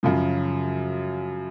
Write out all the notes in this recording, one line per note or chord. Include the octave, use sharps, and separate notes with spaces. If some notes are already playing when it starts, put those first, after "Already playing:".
F#2 C#3 F3